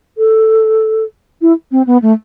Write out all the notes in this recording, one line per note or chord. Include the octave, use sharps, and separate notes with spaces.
A4
E4
C4
B3
A3